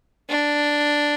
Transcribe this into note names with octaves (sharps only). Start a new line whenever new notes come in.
D4